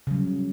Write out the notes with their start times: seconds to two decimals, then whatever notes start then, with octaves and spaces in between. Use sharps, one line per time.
0.07 C#3
0.11 F#3
0.14 G3